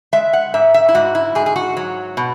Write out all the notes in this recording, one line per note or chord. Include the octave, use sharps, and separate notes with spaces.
G#3 E5
F#5
G#2 E5
E5
E4
G#2 F#4
E4
G#2 G#4
G#4
F#4
F#3
B2